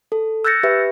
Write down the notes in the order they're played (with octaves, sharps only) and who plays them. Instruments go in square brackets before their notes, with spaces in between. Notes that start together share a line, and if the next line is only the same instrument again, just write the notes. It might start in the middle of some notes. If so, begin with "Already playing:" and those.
[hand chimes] A4
E6 F#6 G6 A6 A#6 C#7
G4 B4 E5